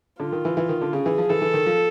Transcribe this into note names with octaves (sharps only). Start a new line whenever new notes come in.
D3 F4
D#3
E3
E3
D#3
D3
C#3 G#4
E3
F3
E3 A4
E3
D#3
F3